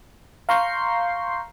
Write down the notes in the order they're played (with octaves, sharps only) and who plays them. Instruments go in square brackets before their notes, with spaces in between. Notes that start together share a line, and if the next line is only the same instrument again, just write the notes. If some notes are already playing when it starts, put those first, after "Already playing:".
[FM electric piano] F5 A#5 C6 C#6 G6 C7